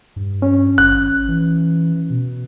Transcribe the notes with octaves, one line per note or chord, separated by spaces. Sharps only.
G2
C#4
G#1 F#6
E3
B2